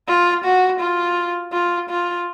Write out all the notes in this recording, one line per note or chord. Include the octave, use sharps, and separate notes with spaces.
F4
F#4
F4
F4
F4